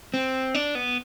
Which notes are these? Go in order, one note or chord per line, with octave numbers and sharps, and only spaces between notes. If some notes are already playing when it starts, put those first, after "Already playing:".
C4
D4
B3